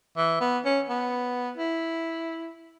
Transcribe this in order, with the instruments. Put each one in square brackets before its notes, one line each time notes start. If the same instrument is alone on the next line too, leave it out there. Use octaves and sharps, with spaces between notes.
[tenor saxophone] E3
B3
C#4
B3
E4